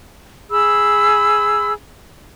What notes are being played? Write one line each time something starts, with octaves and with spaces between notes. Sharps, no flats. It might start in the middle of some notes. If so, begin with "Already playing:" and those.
G#4 B5 E6